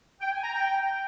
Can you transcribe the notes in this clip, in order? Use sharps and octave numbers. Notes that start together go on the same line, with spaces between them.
G5
G#5
A#5
G5